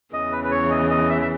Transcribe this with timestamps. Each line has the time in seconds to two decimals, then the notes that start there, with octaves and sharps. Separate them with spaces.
0.13 E2 C#3 E3 D#5
0.32 B4
0.44 B4
0.51 C#5
0.70 D#5
0.90 D#5
1.10 E5
1.22 E5